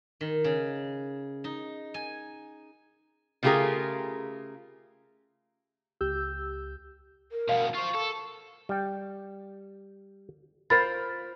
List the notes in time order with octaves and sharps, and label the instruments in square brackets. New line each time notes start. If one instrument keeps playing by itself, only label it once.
[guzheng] D#3
C#3
D#4
G#5
[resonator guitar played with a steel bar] C#3 A3 F4 G4 G#4 A#4
[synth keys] C#2 G4 E6 G6
[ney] A#4
[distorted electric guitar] D2 B2 [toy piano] F5
[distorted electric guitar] F4 C5 [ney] C#6
[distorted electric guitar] A4
[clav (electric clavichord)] G3 G5
[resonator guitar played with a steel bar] F4 A#4 C5 [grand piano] B5 [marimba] A6